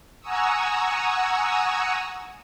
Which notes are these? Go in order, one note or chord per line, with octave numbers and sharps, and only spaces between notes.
F#5 G#5 A#5 C#6 D#6 E6